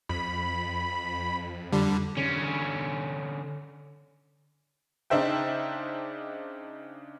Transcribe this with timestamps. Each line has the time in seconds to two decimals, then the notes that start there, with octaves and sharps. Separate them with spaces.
0.09 F2 B5
1.73 D3 G3
2.17 D3 C#4
5.10 C#3 D4 D#4 C5 E5 G5